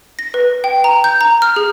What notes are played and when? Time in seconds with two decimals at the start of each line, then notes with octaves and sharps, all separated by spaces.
0.19 A#6
0.34 B4
0.64 G5
0.84 A#5
1.04 G6
1.21 A#5
1.42 F6
1.56 G#4